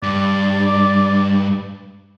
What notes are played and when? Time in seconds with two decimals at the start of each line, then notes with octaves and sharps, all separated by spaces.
0.03 G2 D5